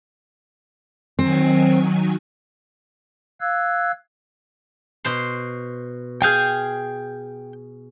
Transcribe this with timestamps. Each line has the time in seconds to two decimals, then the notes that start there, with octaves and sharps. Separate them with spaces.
1.19 D#3 F#3 C4 G#5
3.40 F5 E6 F#6 G#6
5.05 B2 C5 C6
6.22 G#4 F5 G5 G#5 G6